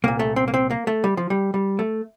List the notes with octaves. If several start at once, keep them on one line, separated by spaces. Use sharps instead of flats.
C2 A#2 A#3
A3
C4
A#3
C4
A#3
A3
G3
F3
G3
G3
A3